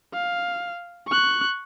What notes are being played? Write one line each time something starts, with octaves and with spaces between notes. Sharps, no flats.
F5
C#6 F#6